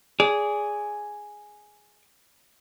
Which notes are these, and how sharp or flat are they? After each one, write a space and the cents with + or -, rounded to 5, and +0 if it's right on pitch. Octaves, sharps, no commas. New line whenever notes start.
G#4 +0 D5 -25